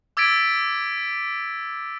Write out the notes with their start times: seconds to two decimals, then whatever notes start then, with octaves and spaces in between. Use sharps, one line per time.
0.17 D6 E6 G#6 A6 B6 D7